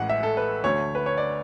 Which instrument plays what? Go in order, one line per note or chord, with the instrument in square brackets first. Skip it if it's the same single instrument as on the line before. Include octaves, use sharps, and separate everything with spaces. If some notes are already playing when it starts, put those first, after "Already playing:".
Already playing: [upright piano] A1 A2 E3 G#3 F#5
E5
A4
B4
D2 D3 A3 C#5
B4
C#5
D5